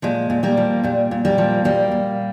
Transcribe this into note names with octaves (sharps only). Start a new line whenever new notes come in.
A#2 F3 G#3
A#2
G3 A#3
F3
A#2 G3
A#2
G3 A#3
F3
A#2 G3 A#3
A#2